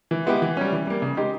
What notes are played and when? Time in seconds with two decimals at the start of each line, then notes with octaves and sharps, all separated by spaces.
0.11 E3
0.26 G#3 B3 E4 G4
0.42 E3
0.57 G3 C#4
0.72 E3
0.87 G3 A#3
1.02 C#3
1.17 G#3 D#4 G4